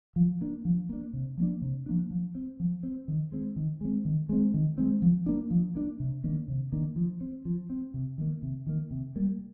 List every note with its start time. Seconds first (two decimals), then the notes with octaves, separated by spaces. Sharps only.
0.16 F3
0.41 A#3 D4
0.65 F3
0.89 A#3 D4
1.13 C3
1.37 F3 A#3 D4
1.62 C3
1.86 F3 A#3 D4
2.11 F3
2.35 C4
2.60 F3
2.83 C4
3.08 D#3
3.32 G#3 C4
3.56 D#3
3.81 G#3 C4
4.05 D#3
4.29 G#3 C4
4.54 D#3
4.78 G#3 C4
5.02 F3
5.26 A#3 D4
5.51 F3
5.75 A#3 D4
6.00 C3
6.24 D#3 A#3 D4
6.48 C3
6.72 D#3 A#3 D4
6.96 F3
7.21 C4
7.45 F3
7.70 C4
7.94 C3
8.18 D#3 A#3
8.42 C3
8.67 D#3 A#3
8.91 C3
9.16 G3 A#3